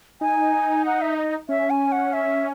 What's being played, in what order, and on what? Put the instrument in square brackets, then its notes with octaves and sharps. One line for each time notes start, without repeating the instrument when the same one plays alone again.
[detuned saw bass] D#4 [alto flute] G#5
[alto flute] F#5
E5
D#5
[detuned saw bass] C#4 [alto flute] E5
[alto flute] G#5
F#5
E5